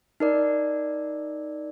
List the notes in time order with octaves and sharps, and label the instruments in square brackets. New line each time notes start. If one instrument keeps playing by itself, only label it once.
[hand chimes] D#4 A#4 D5